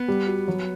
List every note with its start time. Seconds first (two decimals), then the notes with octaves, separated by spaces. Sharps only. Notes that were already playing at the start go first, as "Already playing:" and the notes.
Already playing: B3
0.08 G3
0.27 F#4
0.48 F#3